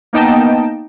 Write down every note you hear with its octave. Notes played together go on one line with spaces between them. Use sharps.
A#3 B3 D#4 D#5 G5 A5